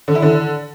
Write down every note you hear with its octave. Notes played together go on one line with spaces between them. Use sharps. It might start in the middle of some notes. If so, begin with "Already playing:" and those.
D3
E4
D3